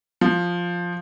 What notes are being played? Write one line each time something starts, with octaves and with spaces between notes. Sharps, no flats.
F3